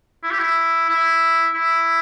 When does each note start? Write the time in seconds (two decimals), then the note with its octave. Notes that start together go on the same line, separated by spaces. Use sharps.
0.23 E4
0.31 G4
0.39 E4
0.89 E4
1.54 E4